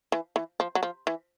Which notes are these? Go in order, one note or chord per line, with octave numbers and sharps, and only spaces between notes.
E3
E3
F3
F#3
F3
E3